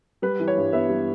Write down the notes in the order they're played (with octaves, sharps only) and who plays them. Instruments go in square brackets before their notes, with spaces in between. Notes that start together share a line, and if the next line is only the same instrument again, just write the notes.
[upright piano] G3 B4
E3
C#5
G2
B3 E5
G3